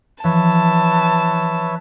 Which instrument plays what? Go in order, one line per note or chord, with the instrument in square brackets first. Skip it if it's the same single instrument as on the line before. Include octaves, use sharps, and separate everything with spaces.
[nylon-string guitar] E3 [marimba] F3 [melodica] B4 C#5 E5 [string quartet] A5